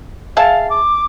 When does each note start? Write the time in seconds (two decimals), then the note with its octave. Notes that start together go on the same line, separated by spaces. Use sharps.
0.37 G#4 E5 F5 A5
0.70 D6